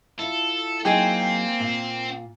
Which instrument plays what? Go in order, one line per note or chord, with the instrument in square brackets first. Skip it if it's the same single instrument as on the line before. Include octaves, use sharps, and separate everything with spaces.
[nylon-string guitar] E4 F4 [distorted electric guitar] A4
[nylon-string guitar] F#3 D#4 G#4 [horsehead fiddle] A#3 [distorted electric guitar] C4 [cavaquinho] G5 G#5
[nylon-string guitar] A#2 F5